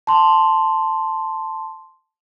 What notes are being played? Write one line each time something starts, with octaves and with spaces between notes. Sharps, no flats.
A5 C6